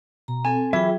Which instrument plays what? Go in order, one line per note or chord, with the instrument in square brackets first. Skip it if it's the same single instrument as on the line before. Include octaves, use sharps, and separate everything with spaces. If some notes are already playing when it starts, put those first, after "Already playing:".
[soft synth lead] B2 [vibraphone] A#5
[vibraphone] C4 A4 [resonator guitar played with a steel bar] G#5
[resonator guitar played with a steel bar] E3 [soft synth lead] F#3 [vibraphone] F4 G#4 G5 [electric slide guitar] E5